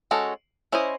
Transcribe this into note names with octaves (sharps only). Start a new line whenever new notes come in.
G#3 C#4 F#4 A4
C#4 E4 C5 D#5